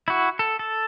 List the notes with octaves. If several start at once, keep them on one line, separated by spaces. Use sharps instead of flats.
E4 F#4
A4
A4